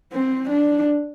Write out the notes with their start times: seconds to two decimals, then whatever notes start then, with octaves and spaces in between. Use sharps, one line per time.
0.13 C4
0.50 D4